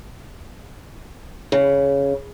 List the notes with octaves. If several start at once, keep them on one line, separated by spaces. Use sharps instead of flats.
C#3